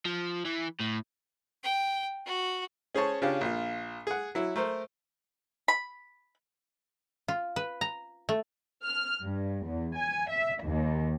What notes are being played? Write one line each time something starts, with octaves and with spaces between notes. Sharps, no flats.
F3
E3
A2
G5
F#4
C#4 G#4 C5 C#5 A5
C#3 C#4 D4 F4 G4
A#1 F4
G#4 F#5
F#3 E4
A3 A#4 C5
B5
F4
B4
A#5
A3
F6
G2
E2
G#5
E5
D#2